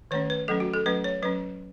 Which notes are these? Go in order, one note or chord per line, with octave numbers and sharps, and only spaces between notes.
D#3 A3 C#4 C#5
B4
F#3 A3 C#4 A4
F#4
A4
F#3 A3 C#4 B4
C#5
F#3 C#4 B4